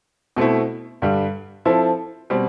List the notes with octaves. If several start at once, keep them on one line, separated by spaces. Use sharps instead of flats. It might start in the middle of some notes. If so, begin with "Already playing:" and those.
B2 A3 C4 E4
G2 D3 G3
F3 C4 E4 A4
B2 G3 C4